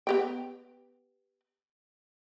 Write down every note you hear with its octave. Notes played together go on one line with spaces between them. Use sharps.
B3 G4 G5